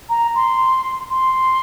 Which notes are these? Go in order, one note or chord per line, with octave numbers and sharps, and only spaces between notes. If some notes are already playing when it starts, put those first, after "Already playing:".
A#5
C6
C6